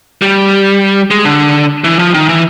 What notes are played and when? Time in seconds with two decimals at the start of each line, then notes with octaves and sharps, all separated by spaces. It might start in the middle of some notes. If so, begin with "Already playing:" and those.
0.22 G3
1.11 G#3
1.25 D3
1.84 E3
1.99 F3
2.14 D#3
2.29 E3